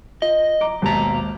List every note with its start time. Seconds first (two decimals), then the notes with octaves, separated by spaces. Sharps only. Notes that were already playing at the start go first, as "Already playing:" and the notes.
0.22 F4 D#5
0.61 A#5 D6 D7
0.82 G#1 D#2 B2 A5 A#5